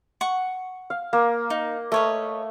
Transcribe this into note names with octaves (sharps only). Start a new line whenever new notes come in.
F#5 C#6
F5
A#3
D#4
A3 B4 C#5 D#5